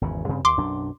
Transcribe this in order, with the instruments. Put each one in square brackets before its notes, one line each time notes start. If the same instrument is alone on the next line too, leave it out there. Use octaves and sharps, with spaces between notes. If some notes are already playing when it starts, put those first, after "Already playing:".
[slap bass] G#1 E2 C#3
G2 C#3 C4
[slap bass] D#2 [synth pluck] C6 D6
[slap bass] B1 F#2 D4